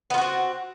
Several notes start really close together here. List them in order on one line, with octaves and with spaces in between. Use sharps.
B3 F4 F#4 C4